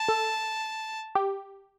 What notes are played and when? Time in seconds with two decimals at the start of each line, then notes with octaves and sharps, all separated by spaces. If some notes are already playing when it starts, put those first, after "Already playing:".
Already playing: A5
0.08 A4
1.15 G4